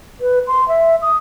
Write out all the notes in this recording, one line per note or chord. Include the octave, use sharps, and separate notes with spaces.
B4
C6
E5
D#6